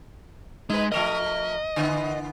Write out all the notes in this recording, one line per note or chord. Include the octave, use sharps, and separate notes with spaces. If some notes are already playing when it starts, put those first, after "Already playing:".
G#3 D#4 B4
F3 A3 A#4 D#5
D3 E3 B3